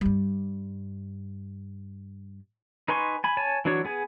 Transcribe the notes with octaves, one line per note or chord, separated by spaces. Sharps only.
G2 G3
D#4 B4 G#5 C6 C#6
G#5 B5
C#5 G#5 A5
E3 F#3 D4 F#4 C#5
B3 G#4 G#5